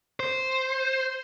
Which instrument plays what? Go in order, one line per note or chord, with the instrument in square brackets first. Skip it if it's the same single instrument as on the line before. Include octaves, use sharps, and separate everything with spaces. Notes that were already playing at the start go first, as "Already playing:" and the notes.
[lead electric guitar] C5